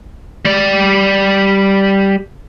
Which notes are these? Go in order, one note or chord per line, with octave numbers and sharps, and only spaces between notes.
G3 D5